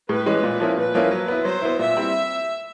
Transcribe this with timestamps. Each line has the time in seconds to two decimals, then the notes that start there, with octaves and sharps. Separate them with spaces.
0.09 A2 B4
0.26 E3 G#3 C#4
0.43 A#2
0.60 F3 A#3 C#4 E4
0.77 A#2 B4
0.94 F3 A#3 C#4 E4
1.11 F#3
1.28 B3 E4
1.45 F#3 C5
1.62 B3 E4
1.79 A#2 E5
1.97 G3 C4 E4